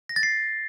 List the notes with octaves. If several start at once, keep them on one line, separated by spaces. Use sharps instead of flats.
A#6
A6
C7